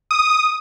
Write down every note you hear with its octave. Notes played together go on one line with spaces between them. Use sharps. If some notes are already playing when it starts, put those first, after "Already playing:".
D#6